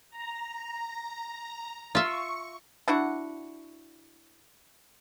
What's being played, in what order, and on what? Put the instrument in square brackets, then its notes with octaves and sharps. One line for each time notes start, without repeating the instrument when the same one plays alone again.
[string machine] A#5
[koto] F4 E5 [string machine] C#6
[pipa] D4 E4 F#4 F#5